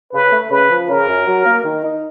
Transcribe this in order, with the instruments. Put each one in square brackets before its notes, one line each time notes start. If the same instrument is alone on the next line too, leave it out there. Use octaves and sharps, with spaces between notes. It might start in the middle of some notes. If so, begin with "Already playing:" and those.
[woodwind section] C#3 [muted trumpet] B4
[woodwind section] A3
[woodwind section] C#3 [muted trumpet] B4
[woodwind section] F3
[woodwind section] C#3 [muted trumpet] A#4
[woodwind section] F#2
F#3
A#3
D#3
D#4